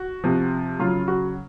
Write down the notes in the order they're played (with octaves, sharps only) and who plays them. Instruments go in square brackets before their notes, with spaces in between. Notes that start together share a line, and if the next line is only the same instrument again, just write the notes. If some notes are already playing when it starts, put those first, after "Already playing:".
Already playing: [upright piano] F#4
C3 F3
C#3 F#3 F4
F#4